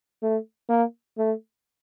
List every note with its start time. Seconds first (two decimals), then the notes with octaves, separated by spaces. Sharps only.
0.22 A3
0.69 A#3
1.18 A3